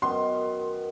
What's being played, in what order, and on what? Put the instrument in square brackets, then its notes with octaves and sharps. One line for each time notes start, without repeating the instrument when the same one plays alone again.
[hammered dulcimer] F#2 D#3 B3 [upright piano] C6